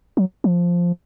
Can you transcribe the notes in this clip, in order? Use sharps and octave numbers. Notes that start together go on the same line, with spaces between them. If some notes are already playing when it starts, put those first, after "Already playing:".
F#3
F3